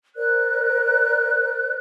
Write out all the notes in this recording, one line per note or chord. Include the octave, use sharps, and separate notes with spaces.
A#4 C5 D5 F#6